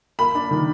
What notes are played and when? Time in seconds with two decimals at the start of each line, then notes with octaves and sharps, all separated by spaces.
0.19 A#3 B5
0.35 D4
0.51 D#3